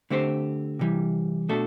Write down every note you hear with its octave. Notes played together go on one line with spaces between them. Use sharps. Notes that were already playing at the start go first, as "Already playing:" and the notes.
D3 A3 C4 G4 C5
C3 E3 G3
B2 A3 D4 F#4 A4